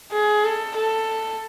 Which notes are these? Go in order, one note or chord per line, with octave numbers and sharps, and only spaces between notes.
G#4
A4
A4